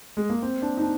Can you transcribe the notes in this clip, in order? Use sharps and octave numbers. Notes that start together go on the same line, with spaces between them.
G#3
A#3
C4
D4
D#4
D4